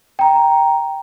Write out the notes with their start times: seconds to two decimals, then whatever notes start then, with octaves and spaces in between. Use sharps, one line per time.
0.19 G5 A#5